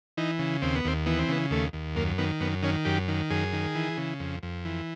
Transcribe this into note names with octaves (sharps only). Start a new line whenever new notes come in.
E3 D#4
C#3
D#2 C4
B3
D#2 C4
E3 B3
C4
C#3 B3
D#2 A3
D#2
F#2 A#3
D#3 B3
F#2 B3
D#3 C#4
F#2 G4
D#3
F#2 G#4
D#3
E3
C#3
F2
F2
E3